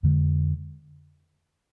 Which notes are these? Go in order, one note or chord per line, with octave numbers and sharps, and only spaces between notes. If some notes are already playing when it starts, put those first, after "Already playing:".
F2 D3 G#3